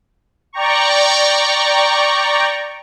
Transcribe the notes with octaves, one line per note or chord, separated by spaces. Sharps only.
D5 G5 A#5 C#6